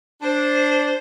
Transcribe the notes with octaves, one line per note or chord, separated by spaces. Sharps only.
D4 C5